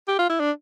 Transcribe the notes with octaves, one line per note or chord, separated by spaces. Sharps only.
G4
F4
E4
D4